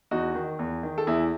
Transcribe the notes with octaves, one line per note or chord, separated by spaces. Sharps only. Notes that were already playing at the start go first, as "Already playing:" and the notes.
E2 D#4 F#4
D#3
E2
D#3
A4
E2 E4 G#4